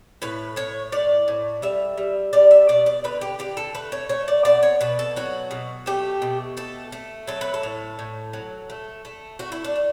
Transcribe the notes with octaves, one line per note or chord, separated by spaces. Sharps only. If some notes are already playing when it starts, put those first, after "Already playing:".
A2 B4
A2 C#5
A2 D5
A2
G3 E5
G3
G3 D5
E5
B2 D5
D5
D3 B4
G4
D3 G4
A4
A3 B4
C#5
A3 C#5
D5
B2 D5
C#5
B2 B4
A4
F#3 F#4
B2
A3 G4
B2
A3 A4
A3
F#3 A4
B4
A4
A2
A2
F#3
A3
A3
A3 F#4
E4
D4
A3